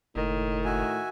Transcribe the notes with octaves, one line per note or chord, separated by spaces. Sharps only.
F#1 A2 D#3
F#4 E5 G#5